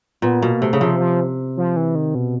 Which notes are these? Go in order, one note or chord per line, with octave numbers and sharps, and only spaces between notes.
A#2 B3
B2 A#3
C3 A3
C#3
C3 F3
F3
F3
E3
D#3
B2